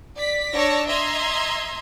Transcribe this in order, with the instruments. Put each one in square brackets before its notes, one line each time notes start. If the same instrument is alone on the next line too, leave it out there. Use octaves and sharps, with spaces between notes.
[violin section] D5 B6
D4 C#5 D5 A5 E6 A#6
D#5 E5 A#5 C6 G#6